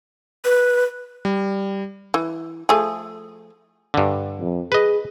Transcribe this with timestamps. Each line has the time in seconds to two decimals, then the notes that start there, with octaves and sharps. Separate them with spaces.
0.45 B4
1.25 G3
2.14 E3
2.69 F3 A3 G#4
3.94 G2 D3
4.40 F2
4.72 G#4 B4 D#5